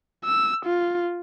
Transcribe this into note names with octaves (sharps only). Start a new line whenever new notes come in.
E6
F4